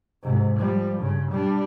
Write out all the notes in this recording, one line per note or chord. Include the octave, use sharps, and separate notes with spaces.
G#2 C3
F3 G3
G2 C#3
G3 D4